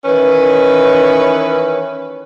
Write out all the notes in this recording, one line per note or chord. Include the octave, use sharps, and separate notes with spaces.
D#3 E3 C#4 B4